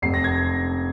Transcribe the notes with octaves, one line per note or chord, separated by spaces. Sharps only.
F1 C7
A#6
G#6